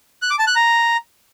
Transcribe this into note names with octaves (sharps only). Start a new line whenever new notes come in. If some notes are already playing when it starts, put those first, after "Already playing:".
F#6
D6
A5
F#6
A#5